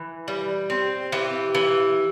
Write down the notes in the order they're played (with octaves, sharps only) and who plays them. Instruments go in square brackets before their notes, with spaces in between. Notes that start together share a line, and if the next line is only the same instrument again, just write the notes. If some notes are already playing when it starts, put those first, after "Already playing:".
Already playing: [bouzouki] E3
G3
C4
E3 G4
E3